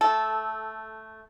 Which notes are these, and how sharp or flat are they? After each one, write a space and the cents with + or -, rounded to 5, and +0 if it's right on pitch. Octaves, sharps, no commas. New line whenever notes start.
A3 +0 A4 -15